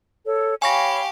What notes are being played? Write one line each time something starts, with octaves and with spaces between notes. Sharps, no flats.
A4 C#5
G4 C#5 F5 G#5 B5 C#6 A#6